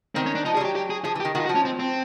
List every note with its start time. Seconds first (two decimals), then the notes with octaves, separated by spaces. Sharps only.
0.15 D#3 C4
0.26 C#4
0.35 D4
0.45 F3 D#4
0.55 G3 G#4
0.61 F#3 G4
0.75 G4
0.90 G#4
1.05 F3 G#4
1.15 E3
1.20 G4
1.25 D#3
1.35 D#3 F#4
1.40 F4
1.45 F#4
1.49 F3
1.55 C#4
1.65 C4
1.79 C4